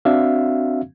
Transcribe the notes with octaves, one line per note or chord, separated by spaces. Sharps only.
C4 D4 F#4 E5 F5